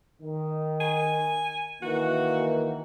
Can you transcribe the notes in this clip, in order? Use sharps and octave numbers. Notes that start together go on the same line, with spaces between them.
D#3
G#5
D#3 E3 A#3 F#4